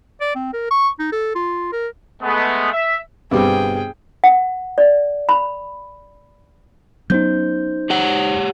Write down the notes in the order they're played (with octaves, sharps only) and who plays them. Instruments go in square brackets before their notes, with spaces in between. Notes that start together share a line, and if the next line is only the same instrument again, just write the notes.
[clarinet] D5
C4
A#4
C#6
D#4
A4
F4
A#4
[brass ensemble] G#3 A3 B3
E5
[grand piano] G1 D6 [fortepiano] B2 G3 C4 [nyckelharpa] G#4 G5
[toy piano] F#5
D5
B5
[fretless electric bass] F#3 B3 C#4 [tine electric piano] D#4 C5 G6
[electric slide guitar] G4 C#5 F#5